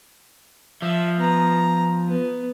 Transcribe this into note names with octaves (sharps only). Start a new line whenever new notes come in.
F3 E5
B3 A#5
B3